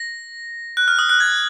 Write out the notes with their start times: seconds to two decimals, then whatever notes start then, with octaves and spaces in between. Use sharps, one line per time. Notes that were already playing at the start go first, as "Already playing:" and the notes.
Already playing: A#6
0.77 F#6
0.88 F6
0.99 D#6
1.09 F#6
1.20 G#6